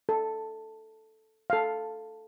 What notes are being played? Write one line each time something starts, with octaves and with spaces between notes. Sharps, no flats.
A4
A4 F5